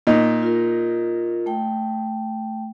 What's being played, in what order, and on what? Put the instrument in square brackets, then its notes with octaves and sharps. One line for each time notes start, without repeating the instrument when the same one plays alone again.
[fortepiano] A#2 D#4
[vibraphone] F4 A#4
A3 G5